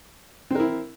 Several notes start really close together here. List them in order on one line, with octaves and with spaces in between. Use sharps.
C4 A#4 E4